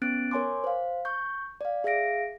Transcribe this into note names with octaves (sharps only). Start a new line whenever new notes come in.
B3 C#4 F#6 A6 D7
A#4 C#5 G#5 C6 D6
C5 F5
C#6 G6
D5 F5
G#4 E5 F5 A#6 D7